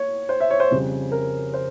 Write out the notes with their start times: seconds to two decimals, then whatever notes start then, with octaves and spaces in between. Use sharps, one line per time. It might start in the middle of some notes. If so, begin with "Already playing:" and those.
Already playing: A#3 C#5
0.29 C5
0.40 E5
0.50 C#5
0.60 C5
0.71 F2 C#3 G3 C4
1.12 A#4
1.54 C5